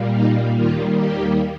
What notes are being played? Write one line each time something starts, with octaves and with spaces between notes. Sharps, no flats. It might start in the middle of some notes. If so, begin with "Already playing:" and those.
Already playing: A#2 G3 A#3
D#4
D#2 D#3 G3 A#3 F4
G4